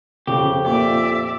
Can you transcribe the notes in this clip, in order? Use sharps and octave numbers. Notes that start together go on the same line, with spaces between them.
F2 C#3 G4
A#2 D5 E5 D6